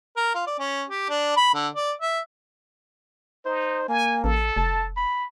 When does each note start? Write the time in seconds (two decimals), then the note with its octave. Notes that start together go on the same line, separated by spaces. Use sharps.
0.17 A#4
0.35 F4
0.47 D5
0.59 C#4
0.89 G4
1.10 D4
1.37 B5
1.55 D3
1.76 D5
2.02 E5
3.46 D#4 C5
3.88 A#3 G#5
4.24 A1 A4
4.57 F1 A5
4.97 B5